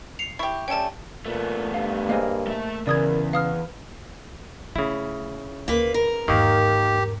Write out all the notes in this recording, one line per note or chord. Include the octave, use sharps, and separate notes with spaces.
C7 C#7 F7
E4 G4 C#6
G3 A3 C#4 G5 A5
A#2 A3 B3
G2 F5
A#3 G#4 C5 D#5 F5
A3 E5
E2 C#3 A#4 D5 D#6 G#6
B4 F5 D#6 F6
C#3 A3 E4
D2 A#3 B4
A#4
E2 G#2 D#3 A#3 G4